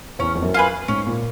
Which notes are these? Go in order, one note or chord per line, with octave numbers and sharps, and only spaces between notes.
E2 C#4
F2
F#2
F4 G#4 B4
G#2 C#4
A#2